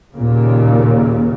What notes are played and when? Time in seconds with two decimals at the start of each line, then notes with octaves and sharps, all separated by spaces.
0.14 D#2 A#2 C#3